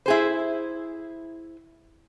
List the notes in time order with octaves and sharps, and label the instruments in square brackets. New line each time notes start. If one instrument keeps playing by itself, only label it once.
[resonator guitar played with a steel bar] E4 G#4 C5